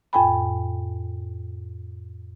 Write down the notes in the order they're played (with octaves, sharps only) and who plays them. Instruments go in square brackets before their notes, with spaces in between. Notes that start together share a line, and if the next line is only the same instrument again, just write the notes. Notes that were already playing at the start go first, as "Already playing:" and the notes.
[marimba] F2 A2 G5 G#5 B5